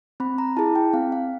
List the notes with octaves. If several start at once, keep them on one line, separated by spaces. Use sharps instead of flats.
C4 B5
A#5
E4 G#4 A5
G5
C4 F5
F5